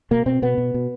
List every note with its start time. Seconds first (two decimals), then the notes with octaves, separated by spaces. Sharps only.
0.11 B2 A#3
0.26 B2 C4
0.42 B2 B3
0.58 B2
0.74 B2